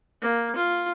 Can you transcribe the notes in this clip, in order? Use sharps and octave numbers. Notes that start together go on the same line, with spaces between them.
A#3
F4